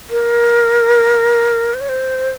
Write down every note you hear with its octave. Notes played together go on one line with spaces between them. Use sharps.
A#4
C5
C#5
C5